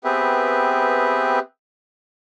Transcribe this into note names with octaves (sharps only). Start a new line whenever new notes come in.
B3 C4 G4 G#4 B4 E5